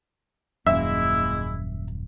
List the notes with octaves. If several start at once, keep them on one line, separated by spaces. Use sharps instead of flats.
D#1 F#2 G#3 A#3 E4 E5